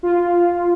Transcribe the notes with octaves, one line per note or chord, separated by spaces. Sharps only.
F4